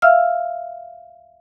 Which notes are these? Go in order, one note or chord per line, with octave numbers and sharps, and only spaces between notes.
E5 F5 E6 F6